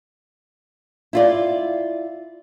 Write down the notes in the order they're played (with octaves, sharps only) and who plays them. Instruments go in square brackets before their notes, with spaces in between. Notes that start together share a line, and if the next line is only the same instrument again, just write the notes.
[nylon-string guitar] E4 F4 D5